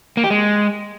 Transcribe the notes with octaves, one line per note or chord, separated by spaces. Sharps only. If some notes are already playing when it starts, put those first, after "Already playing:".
A#3
G4
G#3